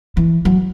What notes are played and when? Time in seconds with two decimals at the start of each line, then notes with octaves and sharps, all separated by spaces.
0.17 E3
0.45 F#3